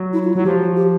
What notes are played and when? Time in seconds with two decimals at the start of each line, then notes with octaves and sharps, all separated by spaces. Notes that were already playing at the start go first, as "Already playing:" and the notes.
Already playing: F#3
0.13 E4
0.24 F4
0.34 F#3 F#4
0.44 F3 G4
0.59 F#4
0.76 G4